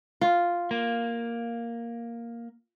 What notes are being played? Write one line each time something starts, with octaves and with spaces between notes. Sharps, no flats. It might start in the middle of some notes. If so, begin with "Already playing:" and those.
F4
A#3